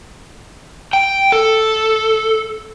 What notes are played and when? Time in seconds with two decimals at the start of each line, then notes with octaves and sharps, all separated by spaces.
0.93 G5
1.32 A4